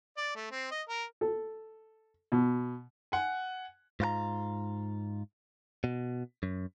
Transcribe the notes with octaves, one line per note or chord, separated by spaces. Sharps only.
D5
A3
C4
D#5
A#4
A4
B2
F#5 G#5
G#2 F4 B4 A#5
B2
F#2